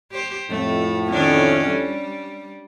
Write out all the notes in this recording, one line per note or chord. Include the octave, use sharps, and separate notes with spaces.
G4 C5
F2 A2 A3
D#3 C#4 D4
G3